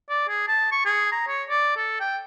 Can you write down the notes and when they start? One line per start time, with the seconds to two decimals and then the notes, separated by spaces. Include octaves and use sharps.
0.10 D5
0.28 G#4
0.48 A5
0.72 C#6
0.85 G#4
1.12 A#5
1.28 C#5
1.49 D5
1.77 A4
2.00 G5